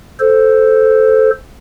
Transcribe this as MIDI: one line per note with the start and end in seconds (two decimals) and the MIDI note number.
0.20 1.30 69
0.20 1.30 72